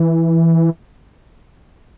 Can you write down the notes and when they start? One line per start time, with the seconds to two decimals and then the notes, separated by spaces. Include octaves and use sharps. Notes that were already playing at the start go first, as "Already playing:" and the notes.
Already playing: E3